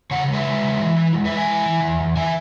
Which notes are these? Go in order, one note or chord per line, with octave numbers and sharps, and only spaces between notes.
C#3 C#5 F#5
G#3
B4 E5
G#3
C#3
E3
E4
G#3
B4 E5
G#3
E5 G#5
E4
E3
E2
E2
E3 E5 G#5